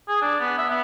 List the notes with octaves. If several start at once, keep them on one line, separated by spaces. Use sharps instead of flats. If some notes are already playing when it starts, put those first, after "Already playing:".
G#4
D4
B3
E5
B3